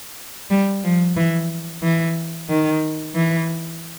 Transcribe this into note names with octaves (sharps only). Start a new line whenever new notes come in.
G3
F3
E3
E3
D#3
E3